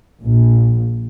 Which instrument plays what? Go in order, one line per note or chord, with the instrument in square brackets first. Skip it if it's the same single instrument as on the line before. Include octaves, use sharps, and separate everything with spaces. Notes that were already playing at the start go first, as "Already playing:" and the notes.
[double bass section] A#1